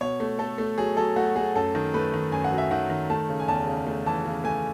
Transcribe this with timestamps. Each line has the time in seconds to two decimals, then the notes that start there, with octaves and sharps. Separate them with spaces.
0.01 B2 C#5
0.20 A3
0.39 A3 A4
0.58 A3
0.78 F#3 G#4
0.97 F#3 A4
1.16 A3 F#4
1.36 A3 G#4
1.55 F#2 A4
1.75 D#3
1.94 A3 B4
2.14 D#3
2.32 F#2 G#5
2.44 F#5
2.51 F#3
2.58 E5
2.71 D#3 F#5
2.90 D#3
3.10 A3 A5
3.29 C#3
3.40 G#5
3.48 E2 A5
3.67 C#3
3.87 A3
4.06 E3 A5
4.25 C#3
4.44 A3 G#5